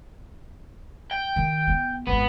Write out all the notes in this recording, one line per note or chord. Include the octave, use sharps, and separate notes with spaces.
G5
D#3
B3
G#1 F2 B3